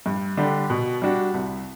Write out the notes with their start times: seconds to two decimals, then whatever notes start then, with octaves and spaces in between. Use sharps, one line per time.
0.06 G2
0.37 D3 G3 D4 G4
0.70 B2
1.02 G3 D4 F#4
1.34 C2